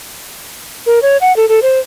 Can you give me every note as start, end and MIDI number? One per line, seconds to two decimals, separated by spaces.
0.86 0.99 70
1.02 1.17 73
1.21 1.35 78
1.36 1.48 69
1.49 1.60 69
1.62 1.79 72